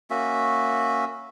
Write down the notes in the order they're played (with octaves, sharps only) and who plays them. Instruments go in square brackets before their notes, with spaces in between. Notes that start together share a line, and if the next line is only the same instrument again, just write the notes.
[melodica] A#3 C#4 F#4 E5